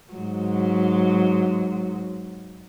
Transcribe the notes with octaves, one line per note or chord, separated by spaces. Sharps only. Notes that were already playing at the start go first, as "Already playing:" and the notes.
G#2 F#3